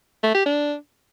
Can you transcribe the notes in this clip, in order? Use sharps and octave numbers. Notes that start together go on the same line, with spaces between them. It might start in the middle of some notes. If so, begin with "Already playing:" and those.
A3
G4
D4